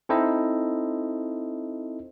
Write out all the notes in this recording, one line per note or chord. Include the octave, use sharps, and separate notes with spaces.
C4 D#4 E4 A4 C5 D#5